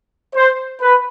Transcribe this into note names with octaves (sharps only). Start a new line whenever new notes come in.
C5
B4